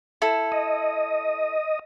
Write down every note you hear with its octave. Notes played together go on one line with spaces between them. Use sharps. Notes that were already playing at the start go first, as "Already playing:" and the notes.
E4 A4
D#5